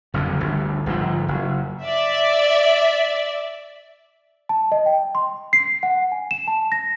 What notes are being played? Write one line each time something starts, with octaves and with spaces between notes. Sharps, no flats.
F#1 F2 D3
G1 D2
G1 G#2 F3
F#1
D5 E5
A5
D#5
G5
C6
C7
F#5
G#5
E7
A5
A#6